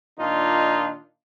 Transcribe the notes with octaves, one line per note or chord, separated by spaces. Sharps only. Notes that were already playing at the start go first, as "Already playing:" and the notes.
A#2 D#3 D4 D#4 F4